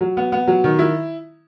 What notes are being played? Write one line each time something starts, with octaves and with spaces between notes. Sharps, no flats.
F#3
B3
B3
F#3
D#3
E4